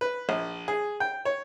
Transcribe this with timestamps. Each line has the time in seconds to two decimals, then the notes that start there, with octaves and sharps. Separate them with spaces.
0.01 B4
0.29 A#1
0.68 G#4
1.00 G5
1.25 C#5